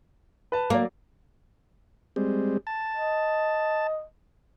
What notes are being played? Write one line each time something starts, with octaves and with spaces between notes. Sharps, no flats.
B4 A5
F#3 A#3 D5
G3 G#3 C4
A5
D#5